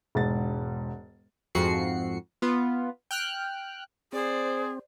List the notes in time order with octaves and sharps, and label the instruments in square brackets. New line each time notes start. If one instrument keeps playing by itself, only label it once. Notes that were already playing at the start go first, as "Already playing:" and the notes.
[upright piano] E1 G#2 A6
[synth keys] F2 G#2 F#4 C7 C#7
B3 F4
G5 F6 F#6
[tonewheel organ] C4 [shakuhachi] G#4 [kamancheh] C5 D5